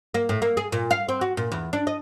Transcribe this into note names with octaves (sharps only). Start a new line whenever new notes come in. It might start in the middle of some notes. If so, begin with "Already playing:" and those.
A#3
A2
A#3
G#4
A#2
F5
C4
F#4
A#2
E2
D4
D#5